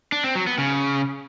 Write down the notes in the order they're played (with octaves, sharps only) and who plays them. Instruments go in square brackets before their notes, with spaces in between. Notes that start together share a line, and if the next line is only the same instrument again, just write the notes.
[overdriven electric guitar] D4
C4
F#3
B3
C#3